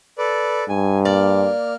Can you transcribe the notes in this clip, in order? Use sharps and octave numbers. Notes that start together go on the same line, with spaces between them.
A4 B4 D5
G2 G#5
A#3 D5 F6